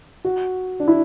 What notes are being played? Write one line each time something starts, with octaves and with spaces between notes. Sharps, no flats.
F#4
D4
E4